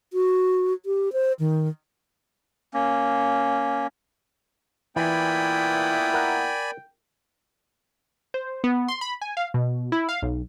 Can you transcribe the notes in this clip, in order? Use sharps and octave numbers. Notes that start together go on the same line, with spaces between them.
F#4
G4
C5
D#3
A#3 C#4
A#2 E3 B3 E4 D5 G5 G#5 B5
A#4 F#5
C5
B3
C6
B5
G#5
F5
B2
E4
F5
B1